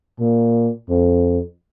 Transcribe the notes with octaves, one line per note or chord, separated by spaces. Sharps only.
A#2
F2